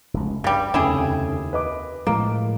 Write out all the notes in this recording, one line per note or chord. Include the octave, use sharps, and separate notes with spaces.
F1 C#2
G2 C#3 G3
F1 D#2 C#3 E4 G4 G#4
B4 D#5 D6
A2 F3 G#3 A#3